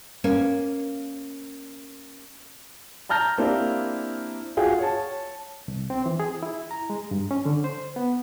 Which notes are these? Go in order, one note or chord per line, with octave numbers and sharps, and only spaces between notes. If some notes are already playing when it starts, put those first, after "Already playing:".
A#3 C#4
A5 A#5 F6 G6 A#6
A#3 C4 D4 E4 G4
F4 F#4 G#4 F#5 G5
C#5 A5
C2
C4
E3
G#4
E4
A#5
G#3
G2
C#4
D3
C5
B3